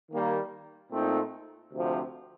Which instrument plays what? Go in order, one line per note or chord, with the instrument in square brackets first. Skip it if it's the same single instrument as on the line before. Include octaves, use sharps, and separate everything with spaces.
[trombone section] D#3 G3 A#3
A#2 A3 C4 D#4
D2 C3 F3